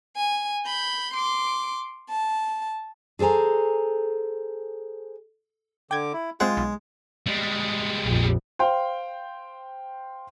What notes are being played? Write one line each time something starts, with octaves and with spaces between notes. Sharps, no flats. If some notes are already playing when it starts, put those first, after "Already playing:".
G#5
B5 G6
C6 D6
A5
G#4 A4 C5 G#5 A#5
D3 G5 D6 G#6
E4
G#3 C4 F4 C5 F#5
B1
G3 G#3
A#1 F2
C5 F5 G5